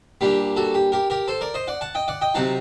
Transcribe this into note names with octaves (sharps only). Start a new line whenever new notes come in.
A#2 G3 A#3 D4 G4
F#4 A4
G4
G4 A#4
G4 A#4
A4 C5
A#4 D5
C5 D#5
D5 F#5
F#5 A5
D#5 G5
D5 F#5
D#5 G5
C3 F#3 C4 D#4 F#5 A5